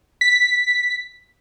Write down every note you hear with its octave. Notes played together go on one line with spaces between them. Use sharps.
B6